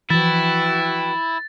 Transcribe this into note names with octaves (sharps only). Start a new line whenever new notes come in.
E3 F3 E4 F#4 B4 G5 A6